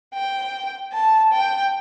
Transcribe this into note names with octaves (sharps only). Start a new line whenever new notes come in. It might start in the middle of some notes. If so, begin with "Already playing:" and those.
G5
A5
G5